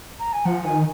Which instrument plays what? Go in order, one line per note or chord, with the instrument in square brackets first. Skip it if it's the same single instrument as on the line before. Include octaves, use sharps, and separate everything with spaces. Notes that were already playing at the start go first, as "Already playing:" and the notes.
[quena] A#5
G#5
[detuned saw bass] F3 [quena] F#5
[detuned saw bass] D#3 [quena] G#5